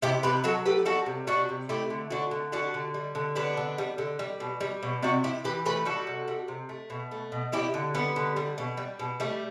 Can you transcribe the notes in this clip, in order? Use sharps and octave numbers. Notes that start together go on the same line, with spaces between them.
C3 E4 G4
C3 G4 B4
F#3 F#4 A4
A3 G4 B4
G3 F#4 A4
C3
G3 D4 F#4
C3
A3 E4 G4
D3
A3 D4 F#4
D3
G3 D4 F#4
D3
G3
D3
G3 B3 D4
D3
G3
D3
G3
B2
G3
B2
C3 D4 F#4
C3 E4 G4
E3 G4 B4
A3 G4 B4
G3 F#4 A4
C3
G3
C3
A3
B2
A3
B2
G3 E4 G4
D3
G3 B3
D3
G3
B2
G3
B2
G3 A3